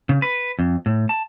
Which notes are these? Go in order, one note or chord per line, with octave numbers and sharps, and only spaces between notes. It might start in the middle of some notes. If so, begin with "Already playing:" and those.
C#3
B4
F2
A2
A5